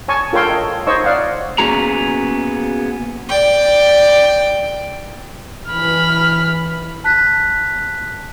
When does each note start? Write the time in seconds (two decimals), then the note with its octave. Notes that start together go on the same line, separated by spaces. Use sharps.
0.08 C#5 G#5 A5 C#6
0.33 F4 A4 A#4 C#5 G5 C6
0.50 D#5
0.87 D#4 C5 C#5 D#5 C#6 E6
1.04 D5 F5 F#5
1.58 A#3 B3 C#4 F#4 G#4 A#5
3.29 D5 G5
5.70 E3 B5 F6
7.04 A5 F#6 B6